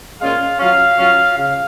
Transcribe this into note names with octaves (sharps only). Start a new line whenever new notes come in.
A#2 G#3 C#4 F4 F5
F#3 C#4 F4 F5
F#3 C#4 F4
C#3 F5